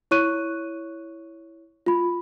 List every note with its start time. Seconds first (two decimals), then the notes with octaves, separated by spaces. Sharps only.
0.11 E4 C#5 C#6 F#6 D#7
1.86 F4 B5